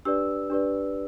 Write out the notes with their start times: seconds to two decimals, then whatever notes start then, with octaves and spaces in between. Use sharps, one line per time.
0.05 D4 G4 B4 D5 E6
0.50 D4 G4 B4 D5